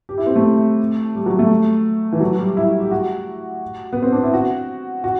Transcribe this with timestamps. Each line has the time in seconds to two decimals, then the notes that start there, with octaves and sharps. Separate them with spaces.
0.09 G4
0.18 E4
0.27 C4
0.36 A3
1.15 G3
1.26 F#3
1.39 A3
2.12 E3
2.20 F#3
2.39 G3
2.57 E4
2.80 G4
2.91 F#4
3.93 B3
4.03 C4
4.12 D4
4.23 E4
4.34 F#4
5.04 F#4